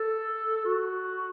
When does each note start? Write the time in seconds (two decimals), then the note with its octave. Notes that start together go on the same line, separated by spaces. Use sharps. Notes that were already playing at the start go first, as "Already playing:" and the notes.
Already playing: A4
0.65 F#4